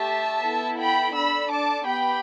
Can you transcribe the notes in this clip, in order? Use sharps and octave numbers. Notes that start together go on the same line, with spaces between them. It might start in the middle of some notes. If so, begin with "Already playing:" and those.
Already playing: A3 G4 E5 A5
B3 E4 A4
G5 B5
D4 A4 B5 E6
A5 D6
B3 G4 G5 B5